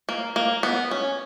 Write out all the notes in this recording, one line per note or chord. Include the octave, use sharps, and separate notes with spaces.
A#3
A#3
B3
C#4